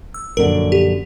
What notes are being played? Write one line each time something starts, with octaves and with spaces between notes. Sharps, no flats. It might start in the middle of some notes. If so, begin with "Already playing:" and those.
E6
A#1 F#2 D3 A#4
G4